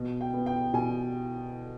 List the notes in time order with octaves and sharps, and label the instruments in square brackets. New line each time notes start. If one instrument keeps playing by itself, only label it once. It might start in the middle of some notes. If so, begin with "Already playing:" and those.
Already playing: [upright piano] B2
G5
B3
G5
B2 G#5